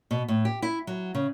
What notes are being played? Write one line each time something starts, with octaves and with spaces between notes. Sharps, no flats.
B2
A2
G4
E4
F#3
C#3